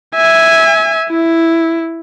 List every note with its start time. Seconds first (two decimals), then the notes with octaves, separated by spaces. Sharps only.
0.16 E5 G#5
1.09 E4